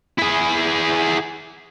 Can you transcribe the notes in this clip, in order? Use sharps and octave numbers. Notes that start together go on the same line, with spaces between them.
E4 G#4